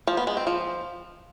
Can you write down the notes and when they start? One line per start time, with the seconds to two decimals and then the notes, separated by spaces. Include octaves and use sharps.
0.07 F3
0.17 B3
0.27 G#3
0.37 C4
0.47 F3